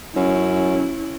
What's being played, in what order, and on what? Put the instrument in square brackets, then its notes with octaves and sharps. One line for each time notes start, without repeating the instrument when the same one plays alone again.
[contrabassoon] F#2 [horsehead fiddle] C#4 E4